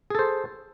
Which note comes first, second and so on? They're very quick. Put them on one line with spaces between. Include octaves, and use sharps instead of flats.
G#4 A4 C5